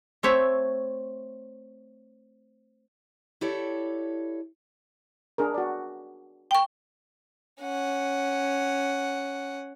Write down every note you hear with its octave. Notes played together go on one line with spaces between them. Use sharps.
A3 C4 C#5 E5
E4 G4 A4 C#5 D5
D4 G#4 A#4
F#4 D5
G5 C#6
C#4 F#5